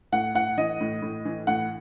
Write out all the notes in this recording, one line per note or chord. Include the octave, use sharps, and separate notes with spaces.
A2 F#5
A2 F#5
E3 D#5
A2
A2
E3
A2 F#5